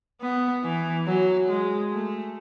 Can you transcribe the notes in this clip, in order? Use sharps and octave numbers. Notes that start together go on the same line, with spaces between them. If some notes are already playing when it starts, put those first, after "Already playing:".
B3
E3
F#3
G#3
A3